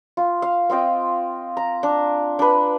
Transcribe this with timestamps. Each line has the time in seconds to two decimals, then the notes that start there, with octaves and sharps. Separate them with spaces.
0.17 F4
0.42 F5
0.70 C4 F4 D#5 G5
1.57 A#5
1.83 D4
2.39 D4 B4